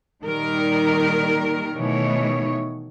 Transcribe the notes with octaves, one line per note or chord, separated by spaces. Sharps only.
A#2 D#3 G3 A#4
B2 D#3 E3 A3 C#5